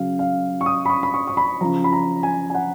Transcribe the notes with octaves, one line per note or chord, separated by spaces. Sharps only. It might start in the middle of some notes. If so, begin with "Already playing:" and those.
Already playing: C#3 F#3 F5
F5
C#6
D#6
B5
C#6
B5
C#6
C#6
B5
C#3 F3 A#5
B5
A#5
G#5
G#5
F#5